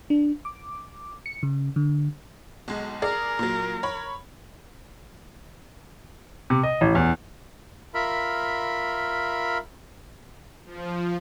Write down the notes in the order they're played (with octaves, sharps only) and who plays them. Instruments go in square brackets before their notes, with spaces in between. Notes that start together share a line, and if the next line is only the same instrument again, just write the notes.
[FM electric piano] D4
D6
C#7
C#3
D3
[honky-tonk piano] B1 G#3
[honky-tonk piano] G#4 D5 [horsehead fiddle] A#4
[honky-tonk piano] A#2 F#3
C#5 B5
[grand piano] C3
D#5
A1
E2
[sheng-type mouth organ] F4 A#4 E5 B5
[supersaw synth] F3